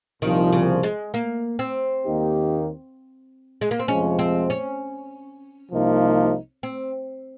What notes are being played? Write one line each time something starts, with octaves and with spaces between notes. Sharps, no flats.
C2 A#2 D#3 F3
C#3
G#3
A#3
C4
D#2 D#3 A#3 D#4 G4
G#3
A#3
C4
F2 C3 F3 G#3 C#4
C4
C#4
C2 C3 F3 A#3 D#4
C4